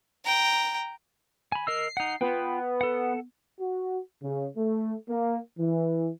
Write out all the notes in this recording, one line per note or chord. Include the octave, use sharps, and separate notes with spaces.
G5 A#5
G#5 B5
A#4 D#5 E6 C7
D#4 F#5
B3 F4 B4 G5
A4 F#5
F#4
C#3
A3
A#3
E3